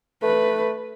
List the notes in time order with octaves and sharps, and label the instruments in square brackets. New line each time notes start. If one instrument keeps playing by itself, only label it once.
[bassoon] A3 [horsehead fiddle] B4